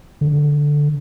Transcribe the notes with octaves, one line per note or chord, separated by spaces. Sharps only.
D3